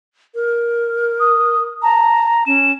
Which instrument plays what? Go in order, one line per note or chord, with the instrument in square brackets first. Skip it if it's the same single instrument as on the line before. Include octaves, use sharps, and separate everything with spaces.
[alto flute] A#4
[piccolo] D#6
[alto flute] A5 [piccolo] A#5
[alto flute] C#4 [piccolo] E7